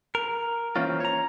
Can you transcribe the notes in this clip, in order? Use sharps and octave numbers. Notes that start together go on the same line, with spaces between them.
A#4
E3 A#3 C4 C#4 F4
C#5 A#5